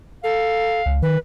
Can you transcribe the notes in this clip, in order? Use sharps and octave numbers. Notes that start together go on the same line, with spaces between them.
A4 F5
C#2
D#3 B4